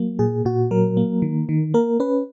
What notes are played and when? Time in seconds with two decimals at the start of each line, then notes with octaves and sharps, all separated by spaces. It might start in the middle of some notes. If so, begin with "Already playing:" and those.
Already playing: F#3 A#3
0.19 A#2 G#4
0.45 A#2 F#4
0.71 F#3 A#4
0.97 A#3
1.22 D#3
1.49 D#3
1.74 A#3 A#4
2.00 C#4 B4